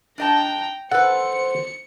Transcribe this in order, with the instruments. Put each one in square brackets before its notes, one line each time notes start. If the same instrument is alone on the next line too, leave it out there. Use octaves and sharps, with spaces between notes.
[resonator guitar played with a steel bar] D4 D#5 A5 [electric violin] G5 A#5
[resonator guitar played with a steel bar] A4 B4 [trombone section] C5 [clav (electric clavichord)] F#5 [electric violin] C#7